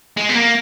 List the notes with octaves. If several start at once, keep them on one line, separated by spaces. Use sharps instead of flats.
G#3
B3
A#3